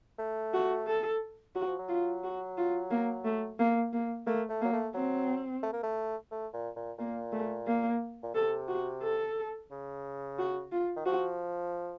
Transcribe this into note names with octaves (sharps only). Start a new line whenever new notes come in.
A3
F#4
A4
F#3 F#4
F3
F#3
F4
F#4
F4
A#3
A3
A#3
A#3
A3 A#3
A3
F#3 A#3
A3
F#3 C4
A3
A#3
A3
A3
A#2
A#2
A#2 A#3
A3
A#3
A#2
C3 A4
F#4
A4
C#3
F#4
F4
D#3
F3 F#4